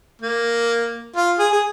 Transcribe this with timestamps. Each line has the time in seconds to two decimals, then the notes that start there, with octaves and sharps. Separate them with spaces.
0.22 A#3
1.16 F4
1.39 G#4
1.52 G#4